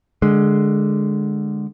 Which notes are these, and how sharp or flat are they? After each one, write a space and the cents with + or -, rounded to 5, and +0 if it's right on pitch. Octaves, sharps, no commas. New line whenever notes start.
D3 +15 G#3 +0